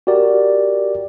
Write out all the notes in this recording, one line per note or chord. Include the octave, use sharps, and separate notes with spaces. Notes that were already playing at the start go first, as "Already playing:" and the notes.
F#4 G4 A#4 D5